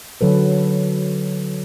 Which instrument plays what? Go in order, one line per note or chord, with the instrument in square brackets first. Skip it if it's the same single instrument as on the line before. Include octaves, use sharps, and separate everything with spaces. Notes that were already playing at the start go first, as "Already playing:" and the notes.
[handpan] D3 F#3 A4 B4